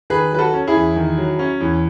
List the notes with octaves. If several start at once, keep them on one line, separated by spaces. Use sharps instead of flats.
D#3 G#4 B4
F#3 B4
F#4 A4
C#4
E4 G#4
E2
D#3
F#3
C#4
E2